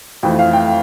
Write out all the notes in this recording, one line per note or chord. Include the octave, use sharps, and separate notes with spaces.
F2 E3 A3 G5
F5
G5